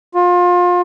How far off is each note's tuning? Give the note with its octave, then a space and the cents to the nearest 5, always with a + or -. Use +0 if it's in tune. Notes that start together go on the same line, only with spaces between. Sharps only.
F4 +30